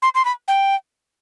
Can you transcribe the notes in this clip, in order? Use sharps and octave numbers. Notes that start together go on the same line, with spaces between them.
C6
C6
B5
G5